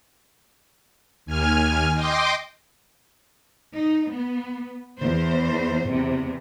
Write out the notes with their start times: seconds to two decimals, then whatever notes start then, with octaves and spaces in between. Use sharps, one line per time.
1.26 D#2 G#5 F6
1.95 D#5 G5 C6 D6
3.74 D#4
4.14 B3
5.00 E2 C5
5.89 E2 C3